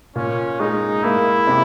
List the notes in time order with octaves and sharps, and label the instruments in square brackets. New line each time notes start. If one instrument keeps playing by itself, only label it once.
[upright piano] A#2 [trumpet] C#4
[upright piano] G#3 [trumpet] D#4
[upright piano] A#3 [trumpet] E4
[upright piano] C3